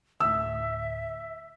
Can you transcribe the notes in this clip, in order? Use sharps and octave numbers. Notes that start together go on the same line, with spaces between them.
D2 A2 E5 E6